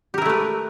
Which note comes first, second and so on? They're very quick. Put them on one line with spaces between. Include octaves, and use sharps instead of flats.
G4 A#4 E4 A3 B4